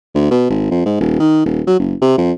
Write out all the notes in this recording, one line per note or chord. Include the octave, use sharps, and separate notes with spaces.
D2
B2
G#1
F2
G#2
D#1
D#3
D#1
F#3
F#1
C3
F2